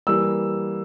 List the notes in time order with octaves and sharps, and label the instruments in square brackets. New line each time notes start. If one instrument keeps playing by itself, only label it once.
[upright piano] E3 G3 A#3 E6